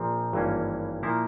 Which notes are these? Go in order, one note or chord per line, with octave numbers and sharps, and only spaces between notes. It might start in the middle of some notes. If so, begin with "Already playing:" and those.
Already playing: A#1 A#2 F3 C4
G#1 G2 E3 A#3 C#4
A#2 F3 A#3 E4